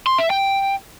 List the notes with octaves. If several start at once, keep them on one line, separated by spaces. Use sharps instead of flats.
C6
E5
G5